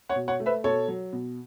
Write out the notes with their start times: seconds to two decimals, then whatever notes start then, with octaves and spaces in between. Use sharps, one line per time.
0.09 C#5 F#5
0.16 B2
0.28 C#5 F#5
0.40 A3
0.46 B4 E5
0.64 B2 A4 C#5
0.88 F#3
1.13 B2